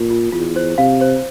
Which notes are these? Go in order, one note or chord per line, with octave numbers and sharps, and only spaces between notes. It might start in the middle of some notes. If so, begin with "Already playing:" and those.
Already playing: A#2
F4
E2 F4
C5
C3 F5
C5